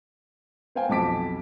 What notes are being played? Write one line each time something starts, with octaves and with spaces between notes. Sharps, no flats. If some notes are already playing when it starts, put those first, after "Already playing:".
B3 C5 F5 G5 G#5
B1 F2 A5 D6 B6 D7